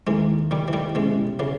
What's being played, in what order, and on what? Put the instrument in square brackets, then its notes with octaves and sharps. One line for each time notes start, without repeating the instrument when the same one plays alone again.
[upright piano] D#2 D#3 A#3 E4 G#4 [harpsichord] E3 G#3
[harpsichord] D#3 G3
E3
D#3 G3
[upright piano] B2 G3 C#4 E4 [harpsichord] E3 G#3
[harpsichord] C#3 E3